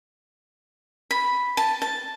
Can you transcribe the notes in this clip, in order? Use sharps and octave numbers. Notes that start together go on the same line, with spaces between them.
B5
A5
A5